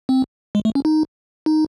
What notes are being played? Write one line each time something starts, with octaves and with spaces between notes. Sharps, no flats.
C4
G#3
A3
C#4
D#4
D#4